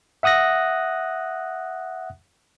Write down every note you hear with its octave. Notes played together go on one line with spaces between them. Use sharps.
E5 F#5 D#6 F#6 A#6